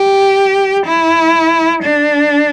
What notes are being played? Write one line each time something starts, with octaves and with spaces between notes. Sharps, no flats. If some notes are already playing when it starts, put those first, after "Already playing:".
Already playing: G4
E4
D4